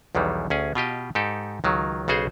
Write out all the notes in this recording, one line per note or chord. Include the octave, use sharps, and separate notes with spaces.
B1 E2 D#3 E3 G3
D2 C#4 G#4
B2 F4 G4 D#5
G#2 D#4 G4 A4
C#2 D#3 F#3
B1 C#3 F#4 G#4 C5